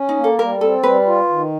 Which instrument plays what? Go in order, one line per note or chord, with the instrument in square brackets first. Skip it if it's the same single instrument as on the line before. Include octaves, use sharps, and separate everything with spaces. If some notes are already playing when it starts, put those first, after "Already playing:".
Already playing: [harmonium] C#4
[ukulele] D#4
[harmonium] A#3
[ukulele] A4
[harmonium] G3 [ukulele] A#4
[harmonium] C4 [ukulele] A4
[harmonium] G3 [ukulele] B4
[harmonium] F4
D#3